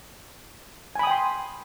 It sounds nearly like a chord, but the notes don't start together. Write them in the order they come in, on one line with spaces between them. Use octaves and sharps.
G#5 B5 D#6 G5 C6